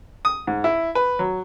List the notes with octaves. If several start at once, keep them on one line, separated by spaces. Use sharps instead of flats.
D#6
G#2
E4
B4
F#3